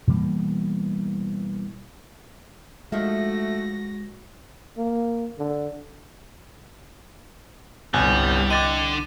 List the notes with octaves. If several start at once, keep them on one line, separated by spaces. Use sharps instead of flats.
B2 E3 G3 A#3
F3 G#3 A3 D#4 F#4 E5 A#6
A#3
D3
G1 C2 G3 G#5 F#6
D3 D#5 G5 D6 A6 D#7